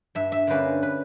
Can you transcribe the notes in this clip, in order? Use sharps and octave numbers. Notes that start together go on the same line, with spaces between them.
G2 E5
E5
D3 G3 A#3 C#4 B4
B4